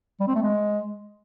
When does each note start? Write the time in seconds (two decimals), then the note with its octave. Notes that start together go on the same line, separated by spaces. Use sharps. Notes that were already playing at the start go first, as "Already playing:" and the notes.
0.20 G3
0.28 C4
0.35 A3
0.43 G#3